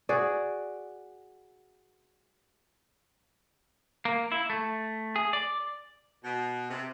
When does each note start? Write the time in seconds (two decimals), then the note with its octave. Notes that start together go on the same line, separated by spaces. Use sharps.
0.09 F#4 G#4 D5
4.05 A#3
4.32 E4
4.50 A3
5.16 G#4
5.33 D5
6.24 B2
6.69 C3